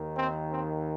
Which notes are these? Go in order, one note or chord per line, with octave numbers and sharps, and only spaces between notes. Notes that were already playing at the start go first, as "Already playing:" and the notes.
Already playing: D#2 D#3
C4
C4